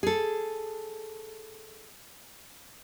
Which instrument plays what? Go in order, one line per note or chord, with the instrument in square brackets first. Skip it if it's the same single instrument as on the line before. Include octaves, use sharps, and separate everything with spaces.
[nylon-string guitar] G#4 A4